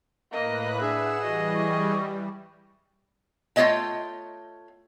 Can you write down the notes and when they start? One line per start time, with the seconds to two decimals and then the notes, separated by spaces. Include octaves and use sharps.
0.32 A2 A#3 B4 D#5 F#6
0.81 D4 G#4 E5 F#5 E7
1.22 E3 G3 F#4 D#5
1.54 C#6
3.56 A3 F4 G4 C#5 D#5 G5